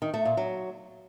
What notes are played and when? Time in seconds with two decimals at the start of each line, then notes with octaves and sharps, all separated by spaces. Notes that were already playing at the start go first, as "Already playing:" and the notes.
0.02 D#3
0.14 A3
0.25 A#2
0.37 F#3